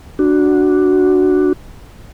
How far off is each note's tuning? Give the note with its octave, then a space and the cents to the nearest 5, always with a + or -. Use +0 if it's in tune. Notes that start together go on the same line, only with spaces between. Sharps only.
D4 +0 F#4 +0